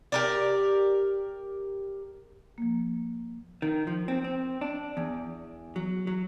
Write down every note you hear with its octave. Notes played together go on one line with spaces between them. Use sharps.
G4 A#4 D5
F3 A#3
D#3
F3
C4
C4
D4
E2
F#3
F#3